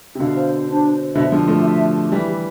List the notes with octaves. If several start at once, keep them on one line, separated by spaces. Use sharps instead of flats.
C3
B2 D3 F5
C5
C5
D4
C5
C5
B2 D3 E5
D3 F3 G4
F3 A3 G4
E5
G4
G4
E3 G3 G4
G4